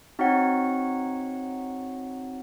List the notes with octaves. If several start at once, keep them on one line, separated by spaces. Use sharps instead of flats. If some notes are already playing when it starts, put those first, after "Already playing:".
C4 D#4 F#4 C#5 F#5